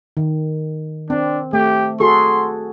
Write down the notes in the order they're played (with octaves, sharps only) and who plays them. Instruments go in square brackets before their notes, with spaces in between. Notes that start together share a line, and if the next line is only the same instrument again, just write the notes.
[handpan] D#3
[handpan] C4 [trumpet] D4
[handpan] A3 [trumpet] G4
[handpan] F#4 G#4 A4 [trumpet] C6